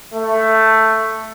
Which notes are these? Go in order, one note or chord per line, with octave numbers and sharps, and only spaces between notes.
A3